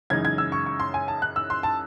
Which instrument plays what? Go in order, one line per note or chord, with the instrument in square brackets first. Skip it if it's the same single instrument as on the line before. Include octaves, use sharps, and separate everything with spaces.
[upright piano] F#2 C#3 E3 G#3 D#4 G#6
G#6
E6
C#6
C#6
C6
G#5
A5
F#6
E6
C6
A5